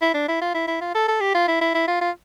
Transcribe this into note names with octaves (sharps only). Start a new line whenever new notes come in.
E4
D4
E4
F4
E4
E4
F4
A4
A4
G4
F4
E4
E4
E4
F4
F4